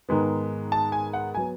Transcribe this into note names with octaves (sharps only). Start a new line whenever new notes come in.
G#2 D#3 G#3 B3
A5
G#5
F#5
F#3 B3 G#5